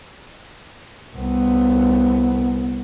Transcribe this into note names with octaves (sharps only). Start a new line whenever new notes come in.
C2 B3